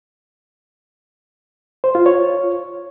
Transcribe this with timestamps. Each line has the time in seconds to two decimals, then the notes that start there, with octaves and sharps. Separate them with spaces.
1.84 C5
1.95 F4
2.06 C#5